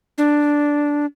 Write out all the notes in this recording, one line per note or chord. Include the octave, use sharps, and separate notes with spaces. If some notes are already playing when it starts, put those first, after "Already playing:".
D4